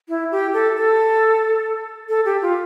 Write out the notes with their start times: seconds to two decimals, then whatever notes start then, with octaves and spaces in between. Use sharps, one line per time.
0.09 E4
0.32 G4
0.53 A4
0.76 A4
2.09 A4
2.25 G4
2.42 F4